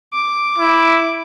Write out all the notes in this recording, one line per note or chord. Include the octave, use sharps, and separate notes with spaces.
D6
E4